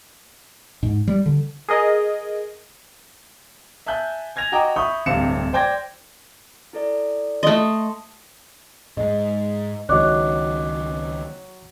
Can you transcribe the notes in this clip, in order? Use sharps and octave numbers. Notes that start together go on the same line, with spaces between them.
G#2
G3
D3
G#4 A#4 D#5
E5 G#5 A5 F#6 G6
G#5 G#6 A#6 F7
F#4 D#5 G5 A#5 D6
E5 B5 C#6 D#6 G6
D1 G2 C3 F5 C#7 E7
C5 D5 G5 G6 G#6 A#6
E4 A4 D5
A3 D#5 C6
G#2 G#3 D#5
C#2 D#3 F#3 C#5 D#5 D6 F#6